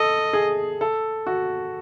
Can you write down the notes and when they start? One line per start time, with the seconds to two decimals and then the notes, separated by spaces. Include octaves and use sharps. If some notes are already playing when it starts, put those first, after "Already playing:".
Already playing: A4 D#5
0.33 G#4
0.81 A4
1.27 F#4